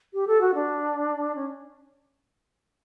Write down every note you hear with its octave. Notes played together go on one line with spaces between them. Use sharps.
G4
A4
F#4
D4
C#4